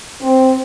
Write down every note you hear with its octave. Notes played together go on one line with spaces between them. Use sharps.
C4